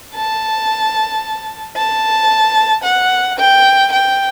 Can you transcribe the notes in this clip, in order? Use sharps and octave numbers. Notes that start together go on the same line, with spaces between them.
A5
A5
F#5
G5
G5